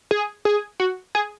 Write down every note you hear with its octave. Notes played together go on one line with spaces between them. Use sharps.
G#4
G#4
F#4
G#4